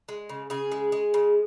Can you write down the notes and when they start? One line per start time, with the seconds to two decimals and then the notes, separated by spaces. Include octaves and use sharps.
0.09 G#3
0.29 C#3
0.50 C#3 G#4
0.72 G#3
0.92 G#3
1.14 C#3